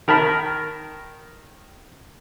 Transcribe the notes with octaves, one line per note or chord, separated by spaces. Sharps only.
D#3 A#4 A5 B5 F6